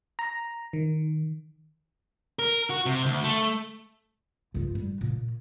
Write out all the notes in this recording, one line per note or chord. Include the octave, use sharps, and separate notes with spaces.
A#5
D#3
A#4
F#4
C3
D2
A3
G2 F4
G3
A#2